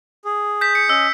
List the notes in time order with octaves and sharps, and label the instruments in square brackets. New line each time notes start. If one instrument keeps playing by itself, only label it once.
[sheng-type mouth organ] G#4
[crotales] G6 B6
C#7
[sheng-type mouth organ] C#4 D#5 [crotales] E6